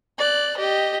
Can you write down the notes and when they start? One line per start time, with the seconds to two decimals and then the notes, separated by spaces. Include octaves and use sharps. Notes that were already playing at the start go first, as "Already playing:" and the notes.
0.18 D5 F#6
0.57 G4 D#5